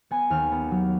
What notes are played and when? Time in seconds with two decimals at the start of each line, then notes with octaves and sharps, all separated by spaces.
0.11 B3 G#5
0.30 D#2 F6
0.52 B3
0.71 F#3